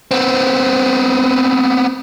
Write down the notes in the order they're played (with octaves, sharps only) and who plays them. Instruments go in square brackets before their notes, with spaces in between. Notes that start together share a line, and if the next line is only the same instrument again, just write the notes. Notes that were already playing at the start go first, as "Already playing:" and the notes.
[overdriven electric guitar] B3 C4